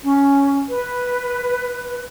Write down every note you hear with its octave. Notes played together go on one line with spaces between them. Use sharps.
C#4
B4